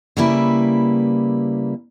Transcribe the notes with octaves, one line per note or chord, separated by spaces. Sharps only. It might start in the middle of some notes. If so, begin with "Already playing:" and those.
C#3 G3 A#3 E4 B4